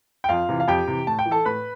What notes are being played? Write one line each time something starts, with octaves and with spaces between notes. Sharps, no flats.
G5
F2 F4 F5
C3 E3
F5
F2 G4 G5
C3 E3
A2 A5
G5
E3
A4 A5
A2 B4 B5